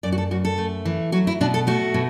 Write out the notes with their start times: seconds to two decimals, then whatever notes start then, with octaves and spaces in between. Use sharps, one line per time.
0.03 F#2 D5
0.12 F#4
0.18 A4
0.31 F#2 F#4
0.45 A4
0.58 A3
0.85 E3
1.12 F#3 F#4
1.27 E4
1.41 B2 D4
1.54 A4
1.67 A3 F#4
1.94 B2